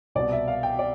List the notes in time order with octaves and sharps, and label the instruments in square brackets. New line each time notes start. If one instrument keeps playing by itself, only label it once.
[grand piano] C2 B2 D5
E5
F5
G5
D5